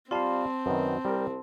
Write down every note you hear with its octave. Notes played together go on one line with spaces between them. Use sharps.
G3 C4 F4 F5 A5 C6
F#2 D#3 B3
C2 G3 A#4